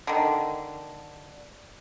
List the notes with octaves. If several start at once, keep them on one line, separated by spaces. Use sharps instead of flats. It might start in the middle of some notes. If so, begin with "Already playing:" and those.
D3 D#3